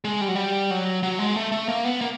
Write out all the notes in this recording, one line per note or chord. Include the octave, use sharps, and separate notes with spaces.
G#3
G3
F#3
G3
F#3
F#3
G#3
A3
A3
A#3
B3
A#3